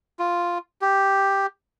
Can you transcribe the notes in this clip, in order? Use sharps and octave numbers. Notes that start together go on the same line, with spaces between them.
F4
G4